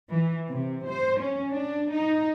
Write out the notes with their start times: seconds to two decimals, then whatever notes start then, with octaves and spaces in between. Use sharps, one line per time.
0.11 E3
0.49 C3
0.88 C5
1.19 C#4
1.52 D4
1.93 D#4